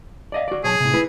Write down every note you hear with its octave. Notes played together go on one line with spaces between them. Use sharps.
D5 D#5 F5
F#4 D5
B1 G#4 C#5 A5
A2 C3
E4 B4